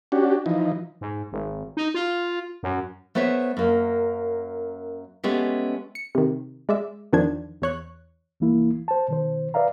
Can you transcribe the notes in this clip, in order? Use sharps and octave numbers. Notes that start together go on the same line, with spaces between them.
C#4 D4 F#4 G4
E3 F3 D#4
G#2
G#1
D#4
F4
F#2
A3 B3 C5 C#5 E5
F#2 A#3
G#3 A3 B3 C#4 G4
C#7
C3 D#3
G#3 D5 E5
E2 D#3 F3 D4 G#6
E2 C#5 F#6
C2 E3 A#3 E4
C5 A5
B2 D#3 C5
B4 D5 E5 F5 A#5